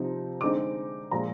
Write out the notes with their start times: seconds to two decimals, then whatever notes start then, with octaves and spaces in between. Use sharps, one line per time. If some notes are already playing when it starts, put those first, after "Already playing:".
Already playing: C3 F3 C4 D#4
0.41 D3 G#3 C4 D#4 D6
1.11 A#2 F3 G#3 A#5